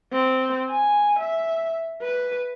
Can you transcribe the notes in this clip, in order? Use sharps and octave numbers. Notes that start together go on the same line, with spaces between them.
C4
G#5
E5
B4